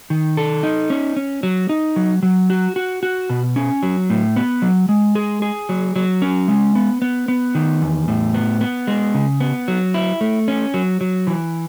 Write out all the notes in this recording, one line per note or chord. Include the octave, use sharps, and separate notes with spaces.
D#3
A4
D#4
C#4
C#4
F#3
D#4
F#3
F#3
F#4
F#4
F#4
B2
C#4
F#3
A2
B3
F#3
G#3
G#4
G#4
F#3
F#3
C#4
G#3
B3
B3
B3
D#3
E2
A2
B3
B3
G#3
C#3
B3
F#3
E4
A3
C#4
F#3
F#3
E3